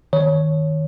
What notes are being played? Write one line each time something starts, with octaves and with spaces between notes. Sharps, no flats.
D#3 C#5